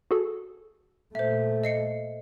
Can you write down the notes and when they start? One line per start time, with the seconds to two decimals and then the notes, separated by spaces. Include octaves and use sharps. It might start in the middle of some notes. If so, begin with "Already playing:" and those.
0.11 F#4 G#4 A4
1.15 A#2 A3 C5 E5
1.64 D#5 C7 C#7